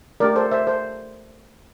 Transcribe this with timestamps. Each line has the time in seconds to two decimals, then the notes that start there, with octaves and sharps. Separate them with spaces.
0.20 A3 D4 G4 A#4 D5
0.36 A4 C5
0.51 C5 E5
0.67 A4 C5